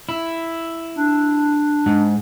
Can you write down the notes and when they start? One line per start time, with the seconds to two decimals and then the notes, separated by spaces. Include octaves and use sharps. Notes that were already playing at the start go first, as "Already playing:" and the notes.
0.09 E4
0.96 D4
1.86 G#2